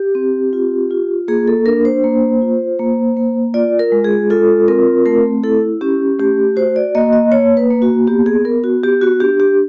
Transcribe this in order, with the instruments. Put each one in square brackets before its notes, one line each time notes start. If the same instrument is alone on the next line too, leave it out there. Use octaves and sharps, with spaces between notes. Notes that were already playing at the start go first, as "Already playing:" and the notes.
Already playing: [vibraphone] G4
C4
F4
F4
A#3 G#4
A4
D4 A#4
C5
A#3
F4
A#3
A#3
F4 D5
A#4
G#3
G#4
F4 A4
C4 A#4
A3 A#4
E4 A4
C#4 G4
A3 G4
F#4 C5
D5
A#3 D#5
D#5
A#3 C#5
B4
A#3
F#4
B3 G4
G#4
B3 A#4
F#4
B3 G4
F#4
D4 G4
G4